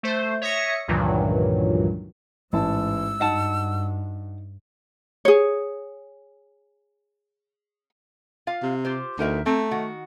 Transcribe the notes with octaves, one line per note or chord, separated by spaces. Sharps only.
A3 C5
C#5 E5 D#6 A#6 C#7
C#2 G2 A#2 D#3 E3 F#3
A1 G#2 A5 E6
G2 D#4 F#4 F#5 A5
G#4 C#5
F4 F5
C3
F4 G4 C5
D2 D#4 A#4 E5
A3 C4 A#5
D#3 F#4